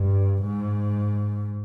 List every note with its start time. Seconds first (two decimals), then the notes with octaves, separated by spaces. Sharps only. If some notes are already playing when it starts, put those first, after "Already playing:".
Already playing: G2
0.43 G#2